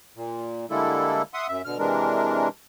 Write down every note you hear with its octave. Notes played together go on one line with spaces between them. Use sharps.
A#2
D3 G3 G#3 A#3 E4 A4
E5 F#5 C6 D#6
F#2 E5
B2 D3 F6
C3 E3 G#3 D4 A#4